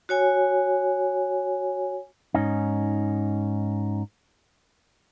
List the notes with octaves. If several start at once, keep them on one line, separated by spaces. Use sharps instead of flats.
F#4 C#5 G#5
G#2 C#4 D#4